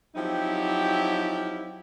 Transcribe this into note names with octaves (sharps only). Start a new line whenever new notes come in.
F3 F#3 C4 D#4 E4 G4